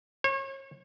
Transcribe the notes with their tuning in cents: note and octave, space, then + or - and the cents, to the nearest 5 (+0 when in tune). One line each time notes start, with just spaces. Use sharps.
C#5 -35